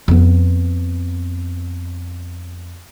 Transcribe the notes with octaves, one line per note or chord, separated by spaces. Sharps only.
F2 B3